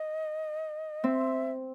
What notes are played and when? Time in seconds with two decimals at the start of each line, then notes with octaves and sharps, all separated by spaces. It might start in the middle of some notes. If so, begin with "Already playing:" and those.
Already playing: D#5
1.04 C4 E5